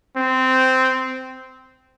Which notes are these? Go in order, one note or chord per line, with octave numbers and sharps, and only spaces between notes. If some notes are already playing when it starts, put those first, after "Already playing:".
C4